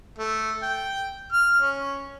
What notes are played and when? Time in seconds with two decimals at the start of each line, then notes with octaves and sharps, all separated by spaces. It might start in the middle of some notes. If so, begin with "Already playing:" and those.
0.19 A3
0.63 G5
1.32 F6
1.59 C#4